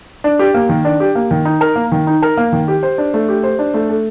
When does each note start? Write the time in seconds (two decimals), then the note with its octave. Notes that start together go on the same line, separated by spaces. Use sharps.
0.24 D4
0.39 G4
0.54 A#3
0.69 D#3
0.85 D4
1.00 G4
1.15 A#3
1.31 D#3
1.45 D#4
1.61 A#4
1.76 A#3
1.92 D#3
2.07 D#4
2.22 A#4
2.37 A#3
2.52 D#3
2.68 G4
2.83 C5
2.98 D4
3.14 A3
3.29 G4
3.43 C5
3.59 D4
3.74 A3
3.89 A4